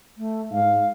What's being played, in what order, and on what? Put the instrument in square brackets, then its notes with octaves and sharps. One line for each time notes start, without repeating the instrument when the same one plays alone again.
[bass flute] A3
[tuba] G#2 [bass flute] F5